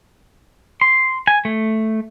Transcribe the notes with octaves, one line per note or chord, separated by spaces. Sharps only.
C6
G#5
A3